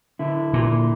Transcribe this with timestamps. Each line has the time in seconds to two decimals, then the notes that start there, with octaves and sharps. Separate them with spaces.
0.19 D3 E4
0.54 A#2